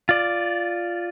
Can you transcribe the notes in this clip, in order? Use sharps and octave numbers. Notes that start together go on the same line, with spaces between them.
F4 D5